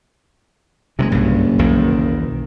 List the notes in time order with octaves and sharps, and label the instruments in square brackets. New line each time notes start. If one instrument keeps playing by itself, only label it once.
[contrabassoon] F#1 [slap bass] C3 F#3 G#3
[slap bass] B1 G2
B1 E2 D#3